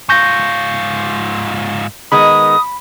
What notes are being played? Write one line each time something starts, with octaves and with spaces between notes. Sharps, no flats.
G#2 F4 C#6 G6 A#6
D#3 G#3 B3 B5 D#6